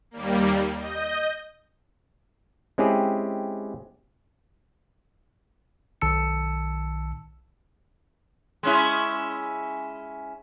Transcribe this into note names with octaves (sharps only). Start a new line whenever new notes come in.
D#2 G3 A#3
D#5 G6
G#3 C4 C#4 E4 G4 G#4
B1 D#3 A5 E6 C#7
G#3 C#4 E4